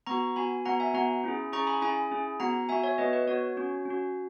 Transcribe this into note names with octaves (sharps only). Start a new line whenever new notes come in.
B3 F#4 A#5 C#6
B3 F#4 G#5 B5
B3 F#4 F#5 A#5
E5 G#5
B3 F#4 F#5 A#5
C#4 E4 G#4
C#4 E4 G#4 A#5 C#6
G#5 B5
C#4 E4 G#4 G#5 B5
C#4 E4 G#4
B3 F#4 F#5 A#5
B3 F#4 E5 G#5
C#5 E5
B3 F#4 B4 D#5
B4
B3 F#4 C#5
C#4 F#4
C#4 F#4